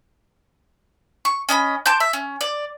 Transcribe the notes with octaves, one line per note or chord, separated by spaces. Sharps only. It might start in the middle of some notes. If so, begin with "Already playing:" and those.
C#6
C#4 D#5 A5 B5
A5 C6 D6 G6
E5
C#4
D5